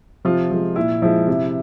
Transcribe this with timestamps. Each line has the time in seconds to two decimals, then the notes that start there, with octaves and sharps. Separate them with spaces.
0.25 C3 F3 F4
0.51 F3 G#3
0.76 A#2 E4
1.02 F3 G#3 E4
1.28 C3